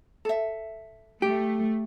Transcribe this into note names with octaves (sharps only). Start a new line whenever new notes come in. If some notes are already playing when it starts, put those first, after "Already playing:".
A4 E5
A3 G4